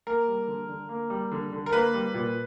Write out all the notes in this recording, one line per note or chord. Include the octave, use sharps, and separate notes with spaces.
A#3 A#4
G3
D3
D3
A#3
G3
D3
D3
A#4
A#3 B4
G3
A#2